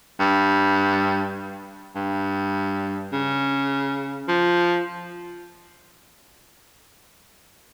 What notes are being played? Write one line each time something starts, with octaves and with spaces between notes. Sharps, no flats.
G2
G2
C#3
F3